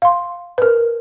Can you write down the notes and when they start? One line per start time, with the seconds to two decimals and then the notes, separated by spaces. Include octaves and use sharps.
0.02 F5 C6
0.58 A#4 B4